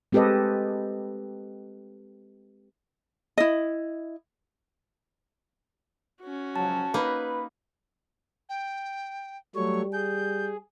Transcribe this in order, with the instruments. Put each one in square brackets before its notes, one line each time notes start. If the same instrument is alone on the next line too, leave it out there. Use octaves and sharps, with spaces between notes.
[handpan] G#3 C4 G4 A4 B4 D#5
[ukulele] E4 D#5
[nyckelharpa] C#4 F#4
[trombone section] C#2 F3 F#3 [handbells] A5
[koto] A#3 D#4 [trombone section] B4 [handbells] B5
[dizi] G5
[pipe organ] F#3 A3 C#5 [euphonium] G3 [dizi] C#6
[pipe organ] G#4 [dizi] G6